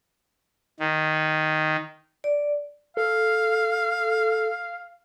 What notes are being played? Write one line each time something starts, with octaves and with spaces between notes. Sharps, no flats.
D#3
D5
A4 F5